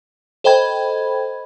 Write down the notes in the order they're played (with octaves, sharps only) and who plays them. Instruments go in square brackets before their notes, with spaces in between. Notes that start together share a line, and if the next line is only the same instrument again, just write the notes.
[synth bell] A4 C5 D#5 G5 B5 G#6